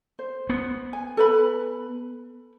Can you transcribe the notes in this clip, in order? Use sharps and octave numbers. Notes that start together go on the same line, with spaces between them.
C5
B3
G#5
A4 B4 B5